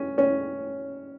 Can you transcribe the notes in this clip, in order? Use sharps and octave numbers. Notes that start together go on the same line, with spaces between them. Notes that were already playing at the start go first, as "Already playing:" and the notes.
Already playing: C#4
C#4